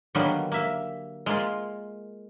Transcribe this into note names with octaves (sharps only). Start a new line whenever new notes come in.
D3 D#3 F#3 G3 A#3 B3
A#3 E5
G#3 A#3 F4